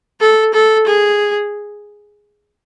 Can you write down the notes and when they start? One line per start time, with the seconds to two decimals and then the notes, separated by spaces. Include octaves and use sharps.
0.20 A4
0.54 A4
0.86 G#4